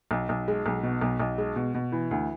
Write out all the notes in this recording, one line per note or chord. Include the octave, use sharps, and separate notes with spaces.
B1
B1
G#3
B1
B2
B1
B1
G#3
B2
B2
E3
D2